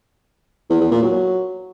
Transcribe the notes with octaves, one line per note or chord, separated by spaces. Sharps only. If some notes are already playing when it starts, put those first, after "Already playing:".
E2
E2
A#2
F#3